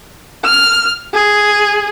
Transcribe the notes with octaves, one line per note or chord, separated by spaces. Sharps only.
F6
G#4